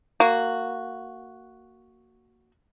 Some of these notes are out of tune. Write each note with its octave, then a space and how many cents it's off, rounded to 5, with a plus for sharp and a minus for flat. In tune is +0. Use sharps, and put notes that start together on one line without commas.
A#3 -15 F#4 +0